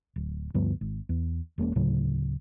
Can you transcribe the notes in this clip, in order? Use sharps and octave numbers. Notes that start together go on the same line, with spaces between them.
D1
D2 G2 F3 B3
G#1
E2
E1 G#3 A#3 C#4
D2 A2 C#3 F#3